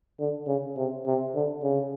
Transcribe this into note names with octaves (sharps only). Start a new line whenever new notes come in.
D3
C#3
C3
C3
D3
C#3